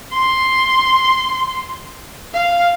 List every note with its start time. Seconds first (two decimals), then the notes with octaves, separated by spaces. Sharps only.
0.13 C6
2.34 F5